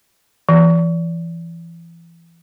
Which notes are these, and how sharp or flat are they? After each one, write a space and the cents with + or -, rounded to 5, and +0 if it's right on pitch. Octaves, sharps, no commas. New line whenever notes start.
E3 +30